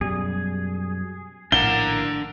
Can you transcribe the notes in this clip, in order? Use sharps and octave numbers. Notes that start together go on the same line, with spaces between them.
F#2 B2 G3 G#4
A#1 A2 D4 A#4 F5 F#5 G7